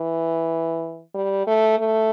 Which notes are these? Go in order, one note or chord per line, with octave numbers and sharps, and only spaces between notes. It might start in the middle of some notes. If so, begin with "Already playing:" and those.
Already playing: E3
G3
A3
A3